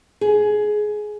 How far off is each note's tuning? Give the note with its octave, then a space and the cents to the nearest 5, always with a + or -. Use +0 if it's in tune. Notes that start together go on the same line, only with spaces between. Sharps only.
G#4 +15